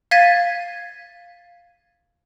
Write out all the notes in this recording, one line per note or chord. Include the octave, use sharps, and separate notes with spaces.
F5 G#6 A6 B6 D#7